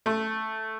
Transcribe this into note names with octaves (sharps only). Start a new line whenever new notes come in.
A3